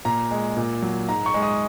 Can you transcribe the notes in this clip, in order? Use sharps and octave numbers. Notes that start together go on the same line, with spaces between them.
A#2 A#5
G#3
A#2
F#3
G#2 A#5
C#6
G#3
D#6